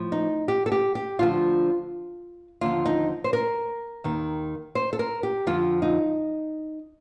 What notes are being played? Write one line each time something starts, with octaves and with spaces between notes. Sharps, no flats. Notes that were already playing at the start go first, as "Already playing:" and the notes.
Already playing: A2 F3
D#4
G4
A4
G4
G4
D2 D3 F3 F4
D#2 D3 F3 F4
D#4
C5
A#4
D#2 D#3
C5
A4
A#4
G4
F2 D3 F3 F4
D#4